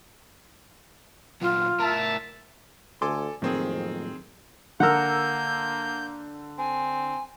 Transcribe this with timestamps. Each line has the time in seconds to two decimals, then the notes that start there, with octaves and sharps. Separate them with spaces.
1.41 A#2 F#3 F4
1.79 A2 A#4 E5 A5 A#5
3.02 D2 A4 G#5 C6 D6
3.42 F2 A2 D#3 F#3 A#3 C4 G#4
4.80 D3 A#3 A#4 F#5 E6 G6
6.58 C4 G#5